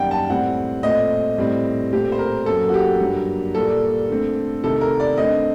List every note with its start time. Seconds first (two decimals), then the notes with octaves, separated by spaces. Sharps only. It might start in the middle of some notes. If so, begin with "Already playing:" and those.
Already playing: F#2 D#3 G3 A#3 F#5 G5
0.11 A5
0.30 A2 G3 C4 F#5
0.83 A#2 A3 C4 D#5
1.38 A2 G3 C4
1.93 A#2 A3 C4 G4
2.12 C5
2.19 A#4
2.46 F#2 F#3 A#3 A4
2.69 F#4
2.74 G4
3.01 G2 F#3 A#3
3.54 A#2 G3 A#3 A4
4.09 D3 A3 C4
4.64 C3 D#3 A3 A4
4.81 A#4
5.00 D5
5.18 D3 A3 C4 D#5